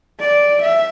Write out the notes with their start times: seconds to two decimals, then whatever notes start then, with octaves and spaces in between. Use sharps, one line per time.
0.20 D5
0.61 E5